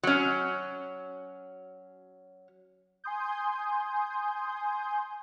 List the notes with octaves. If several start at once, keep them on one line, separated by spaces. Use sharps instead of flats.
F#3 C#4
G#5 C6 D#6 G6